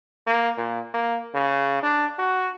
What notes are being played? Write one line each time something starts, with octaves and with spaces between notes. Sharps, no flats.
A#3
A#2
A#3
C#3
D4
F#4